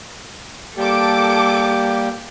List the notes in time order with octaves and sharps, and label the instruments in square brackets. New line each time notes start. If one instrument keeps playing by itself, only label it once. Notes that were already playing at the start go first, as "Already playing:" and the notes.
[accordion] G3 A#3 G4 [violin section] A4 D6